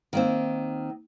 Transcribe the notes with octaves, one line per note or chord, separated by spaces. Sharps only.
D#3 A#3 C4